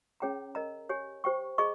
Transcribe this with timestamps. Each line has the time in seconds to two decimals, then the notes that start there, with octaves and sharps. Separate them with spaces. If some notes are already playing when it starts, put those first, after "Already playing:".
0.20 C#4 G#4 C#5 G5 A#5
0.55 A#4 D#5 A#5
0.89 G4 C#5 G#5
1.24 G4 C5 G5 C#6
1.58 G#4 D#5 A#5 C#6